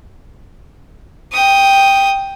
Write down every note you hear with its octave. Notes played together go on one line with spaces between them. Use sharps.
G5 D#6